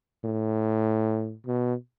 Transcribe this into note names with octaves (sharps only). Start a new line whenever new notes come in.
A2
B2